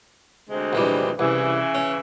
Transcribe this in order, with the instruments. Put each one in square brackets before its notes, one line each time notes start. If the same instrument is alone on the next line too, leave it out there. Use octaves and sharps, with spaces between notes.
[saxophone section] D2 C3 G#3
[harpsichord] A#1 E3 G3
[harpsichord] C2 [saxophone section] C#3 E3
[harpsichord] C#4